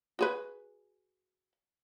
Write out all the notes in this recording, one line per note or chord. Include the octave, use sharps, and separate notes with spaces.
F#4 G#4 B4